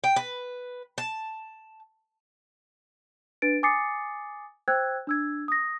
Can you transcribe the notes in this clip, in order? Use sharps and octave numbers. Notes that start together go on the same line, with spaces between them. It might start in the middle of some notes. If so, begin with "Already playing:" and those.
G5
B4
A5
D4 B4 A6 D7
G#5 D6 D#6 A6 C7 C#7
C5 G5 E6 F#6 G#6
D4 E6 G#6
D#6 A#6